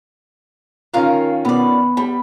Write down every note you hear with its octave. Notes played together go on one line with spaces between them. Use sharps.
D#3 C#4 F4 A#4 F5 A#5
B2 B3 D5
G3 B5